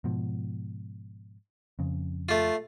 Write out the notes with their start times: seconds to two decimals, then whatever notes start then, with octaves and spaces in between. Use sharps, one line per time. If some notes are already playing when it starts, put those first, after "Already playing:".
0.04 G#2 B2 F3
1.79 F2 C#3
2.29 A3 F4